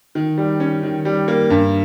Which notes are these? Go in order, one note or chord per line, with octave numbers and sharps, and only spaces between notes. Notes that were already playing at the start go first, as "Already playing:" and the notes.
D#3
G3
C#4
D#3
G3
A#3
G2